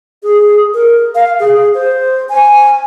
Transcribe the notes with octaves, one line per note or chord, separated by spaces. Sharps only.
G#4
A#4
F5
G#4
C5
G#5